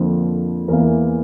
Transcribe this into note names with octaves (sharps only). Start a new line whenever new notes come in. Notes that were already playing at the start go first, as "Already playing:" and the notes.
Already playing: F2 D3 F3 A#3
E2 E3 A#3 A#4